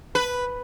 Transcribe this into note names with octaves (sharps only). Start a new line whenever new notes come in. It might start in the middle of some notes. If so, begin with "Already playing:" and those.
B4